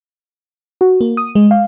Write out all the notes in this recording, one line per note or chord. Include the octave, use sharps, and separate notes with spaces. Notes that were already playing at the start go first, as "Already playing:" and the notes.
F#4
A#3
D#6
G#3
F5